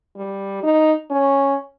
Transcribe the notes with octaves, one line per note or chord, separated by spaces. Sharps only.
G3
D#4
C#4